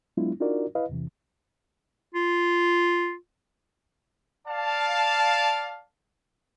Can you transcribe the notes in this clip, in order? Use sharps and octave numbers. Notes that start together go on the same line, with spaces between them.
F#3 G#3 B3 D4 E4 F4
D4 D#4 F4 F#4 A#4 D5
E4 B4 D#5 F5
E2 C3 E3
F4
D5 F5 A5